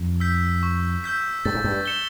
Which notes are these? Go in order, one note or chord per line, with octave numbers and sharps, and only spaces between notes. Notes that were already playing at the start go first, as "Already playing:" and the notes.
Already playing: F2
E6 G6 B6
C#6
E6 G6 B6
G2 A6
G#2
G2
C#7 E7 G7